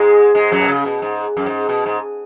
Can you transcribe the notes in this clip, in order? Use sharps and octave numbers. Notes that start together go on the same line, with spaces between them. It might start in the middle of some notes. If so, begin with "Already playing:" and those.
Already playing: G#2 G#3
G#2 G#3
F#2 F#3
B2
C#3
B2
G#2
F#2
G#2
B2
G#2